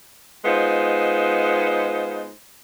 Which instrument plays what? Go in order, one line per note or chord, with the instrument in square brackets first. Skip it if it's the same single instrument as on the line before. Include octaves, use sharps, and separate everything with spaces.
[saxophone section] G#3 B3 D#4 F4 C5